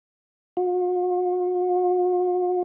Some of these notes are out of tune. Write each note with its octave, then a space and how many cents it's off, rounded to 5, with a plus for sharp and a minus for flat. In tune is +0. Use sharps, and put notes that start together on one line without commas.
F#4 -45